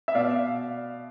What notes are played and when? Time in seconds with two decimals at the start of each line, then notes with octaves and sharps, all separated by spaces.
0.08 E5
0.15 B2 D5 F5